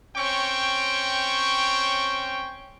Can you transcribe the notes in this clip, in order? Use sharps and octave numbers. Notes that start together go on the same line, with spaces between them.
C4 C#4 C#5 G5 C#6